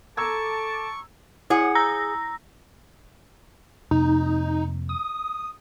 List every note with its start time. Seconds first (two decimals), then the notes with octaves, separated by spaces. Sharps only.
0.17 A4 A5 A#5 C#6 D6 E6 G#6
1.50 E4 G#4 F#5
1.75 A#5 E6 A#6
3.91 F2 C3 A#3 D#4
4.89 D#6